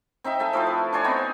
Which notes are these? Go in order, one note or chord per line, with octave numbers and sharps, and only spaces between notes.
C4 D#4 E5 G5
D#4 A4 E5 G#5
F3 A3 E4 F5
B4
D4 C5 C#5 G#5
B3 C4 D#4 A#5